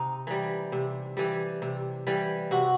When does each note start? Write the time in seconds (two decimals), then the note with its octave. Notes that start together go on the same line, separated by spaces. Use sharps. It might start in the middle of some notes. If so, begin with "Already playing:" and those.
Already playing: C3 D#4
0.27 E3 G3
0.72 C3
1.17 E3 G3
1.62 C3
2.07 E3 G3
2.51 C3 F#4